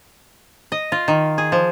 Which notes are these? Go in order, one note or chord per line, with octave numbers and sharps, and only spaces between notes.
D#5
F4
D#3
G#4
F3